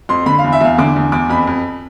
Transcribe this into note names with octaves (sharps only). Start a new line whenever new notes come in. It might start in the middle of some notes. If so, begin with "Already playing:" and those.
F2 C6
D3 B5
F5
E2
E5
E2 F5
D3 D6
E2
E2 D6
F2 B5
F2